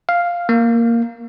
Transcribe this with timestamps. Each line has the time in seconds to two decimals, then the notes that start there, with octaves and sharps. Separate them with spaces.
0.09 F5
0.49 A#3